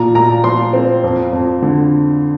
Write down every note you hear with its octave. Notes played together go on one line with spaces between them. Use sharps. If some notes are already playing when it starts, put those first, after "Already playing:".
Already playing: A#2 F3 A#5
A#2 A#5
F3 C6
C4
F2
F2
D3